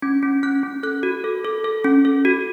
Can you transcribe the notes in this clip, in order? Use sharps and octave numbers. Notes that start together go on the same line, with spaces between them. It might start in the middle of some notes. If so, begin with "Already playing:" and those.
C#4 G#6
C#4
C#4 F#6
C#4
A4 F#6
F#4
A4
A4
A4
C#4
A4
F#4